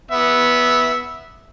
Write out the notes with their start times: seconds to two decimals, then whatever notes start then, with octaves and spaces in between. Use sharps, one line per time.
0.11 B3 E5